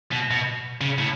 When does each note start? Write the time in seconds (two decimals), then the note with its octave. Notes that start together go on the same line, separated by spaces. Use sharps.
0.12 B2
0.31 B2
0.81 C#3
0.98 A2